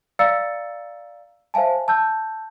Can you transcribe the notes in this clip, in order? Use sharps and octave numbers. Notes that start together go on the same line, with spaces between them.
D5 F5 A#5 E6 A6 C#7
C5 E5 F5 G#5 A5
A5 E6 G6